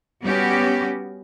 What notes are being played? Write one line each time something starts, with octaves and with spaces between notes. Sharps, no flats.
G3 B3 C#4 F#4 G4